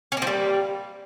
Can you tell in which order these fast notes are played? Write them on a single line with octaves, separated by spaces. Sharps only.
C#4 A#3 F3 G3